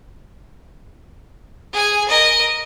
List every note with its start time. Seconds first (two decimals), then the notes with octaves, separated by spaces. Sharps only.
1.73 G#4 G#5
2.08 A#4 D#5